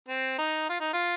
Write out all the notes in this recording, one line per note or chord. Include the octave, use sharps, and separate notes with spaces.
C4
D#4
F4
D#4
F4